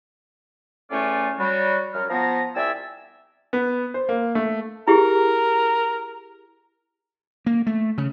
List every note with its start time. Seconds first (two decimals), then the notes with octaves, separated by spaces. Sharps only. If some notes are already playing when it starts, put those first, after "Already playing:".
0.91 E2 A2 A3 C#4 F4 D5
1.39 F#3 G3 F#4
1.94 F#2 F#3 F6
2.10 F3 B3 A#5
2.56 C2 C4 D5 E5 G#5 E6
3.53 B3
3.94 C5
4.09 A#3
4.35 A3
4.88 E4 G4 G#4 A#4
7.46 A#3
7.67 A3
7.98 C#3